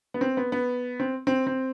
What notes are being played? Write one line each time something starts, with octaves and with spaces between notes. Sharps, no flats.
B3
C4
B3
B3
C4
C4
C4